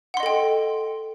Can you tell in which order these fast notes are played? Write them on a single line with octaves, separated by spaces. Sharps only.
F#5 C6 D#5 A4 G5